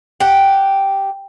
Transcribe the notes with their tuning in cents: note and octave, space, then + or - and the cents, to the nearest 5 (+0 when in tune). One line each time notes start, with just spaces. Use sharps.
G4 +0 F#5 +0